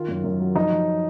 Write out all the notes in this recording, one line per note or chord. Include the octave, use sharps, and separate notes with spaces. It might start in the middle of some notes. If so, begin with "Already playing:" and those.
Already playing: D#3 F4
F#2
F#2
F#3
F3 D#4
F3